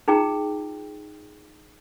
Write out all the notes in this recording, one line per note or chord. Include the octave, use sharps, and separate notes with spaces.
D#4 F4 G#4 G5 A#5